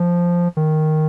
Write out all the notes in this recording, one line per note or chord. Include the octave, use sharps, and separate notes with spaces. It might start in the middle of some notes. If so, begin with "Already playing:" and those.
Already playing: F3
D#3